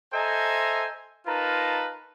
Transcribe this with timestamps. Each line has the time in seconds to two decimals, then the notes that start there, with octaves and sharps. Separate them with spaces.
0.13 A4 C5 D#5 E5 G#5 A#5
1.26 D#4 F4 A#4 B4 A5 A#5